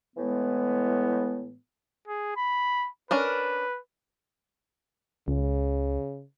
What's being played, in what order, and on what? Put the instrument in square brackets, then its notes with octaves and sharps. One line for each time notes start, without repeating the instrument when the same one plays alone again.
[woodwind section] A2 E3 G#3 B3
[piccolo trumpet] G#4
B5
[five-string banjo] C#4 D4 A#4 [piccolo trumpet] B4
[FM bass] C#2 [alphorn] C#3